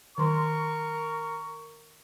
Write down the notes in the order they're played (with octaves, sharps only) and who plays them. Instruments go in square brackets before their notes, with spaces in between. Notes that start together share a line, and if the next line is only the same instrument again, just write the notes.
[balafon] D#3 F#3 C6 [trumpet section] A#4 C#6